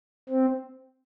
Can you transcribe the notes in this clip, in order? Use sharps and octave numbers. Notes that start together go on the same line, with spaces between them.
C4